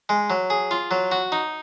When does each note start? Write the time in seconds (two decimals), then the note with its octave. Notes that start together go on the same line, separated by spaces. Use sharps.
0.09 G#3
0.30 F#3
0.50 G#4
0.71 F4
0.91 F#3
1.12 F#4
1.32 D#4